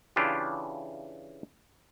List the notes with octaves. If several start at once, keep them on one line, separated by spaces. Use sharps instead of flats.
C#3 E3 D4 E4 F4 G4